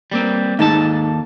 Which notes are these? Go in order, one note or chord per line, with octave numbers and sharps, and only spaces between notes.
G3 A#3 C4
D#2 G#2 A4 A5